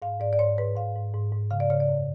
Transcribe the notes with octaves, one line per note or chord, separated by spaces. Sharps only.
G#2 F5
G#2 D5
D5
G#2 C#5
G#2 B4
G#2 F5
G#2
G#2
G#2
C#3 F5
D5
C#3 C#5
D5
F#2